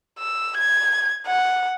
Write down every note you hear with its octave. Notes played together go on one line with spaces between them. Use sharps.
E6
G#6
F#5